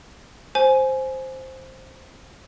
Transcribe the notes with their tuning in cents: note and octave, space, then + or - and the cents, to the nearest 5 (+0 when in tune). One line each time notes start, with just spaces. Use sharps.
C5 +5 G#5 +15